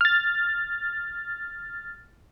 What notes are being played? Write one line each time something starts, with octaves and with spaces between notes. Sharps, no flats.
F6 A6